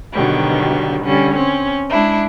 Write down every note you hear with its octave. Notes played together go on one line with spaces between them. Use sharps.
B2 D3 D#3 F#3 G3
D3 G3 C#4
C4 C#4
G#3 D4 E4